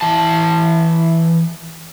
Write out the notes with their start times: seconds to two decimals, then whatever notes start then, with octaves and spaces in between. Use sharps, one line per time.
0.01 E3 A5